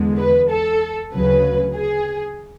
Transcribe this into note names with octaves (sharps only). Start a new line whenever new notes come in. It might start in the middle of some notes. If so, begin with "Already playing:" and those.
Already playing: E2 D3 G#3
B4
A4
D2 C#3 F#3 B4
G#4